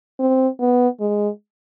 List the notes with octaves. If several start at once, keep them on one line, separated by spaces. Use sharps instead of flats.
C4
B3
G#3